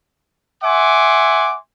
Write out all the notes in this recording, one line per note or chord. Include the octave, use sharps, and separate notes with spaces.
E5 F#5 G#5 C6 D6